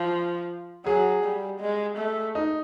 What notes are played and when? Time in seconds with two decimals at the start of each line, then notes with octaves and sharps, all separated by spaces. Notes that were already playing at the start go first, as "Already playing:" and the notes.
Already playing: F3
0.86 F#3 G#4
1.24 G3
1.61 G#3
1.98 A3
2.35 D#4